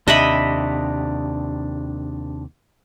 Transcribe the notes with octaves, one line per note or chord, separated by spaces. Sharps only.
D#2 C3 D4 D#5 E5 B5